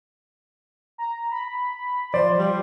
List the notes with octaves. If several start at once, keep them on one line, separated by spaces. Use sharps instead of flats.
A#5
B5
F3 C5 D5
G3